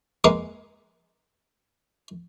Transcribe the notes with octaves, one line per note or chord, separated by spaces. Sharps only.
G#3 A#3 B4